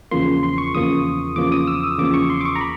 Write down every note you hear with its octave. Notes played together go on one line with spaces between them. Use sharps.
E2 C#3 F3 A#3 C6
C6
C6
C#6
E2 C#3 F3 A#3 D#6
E2 C#3 F3 A#3 D6
D#6
E6
D#6
E2 C#3 F3 A#3 D6
C#6
C6
D6
C#6
A#5
B5